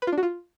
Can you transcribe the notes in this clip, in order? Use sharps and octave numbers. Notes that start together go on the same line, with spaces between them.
B4
F4
D4
F#4
F4